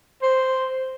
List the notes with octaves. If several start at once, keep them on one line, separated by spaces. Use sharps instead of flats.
C5